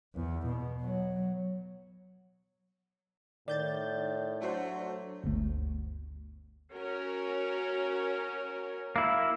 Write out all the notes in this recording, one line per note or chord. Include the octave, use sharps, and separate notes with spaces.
E2
B2
F#3
A2 D#3 D5 G6 A6
F#3 A3 D4 F#4 C5
G1 D2
C#4 F#4 A#4
A#3 E4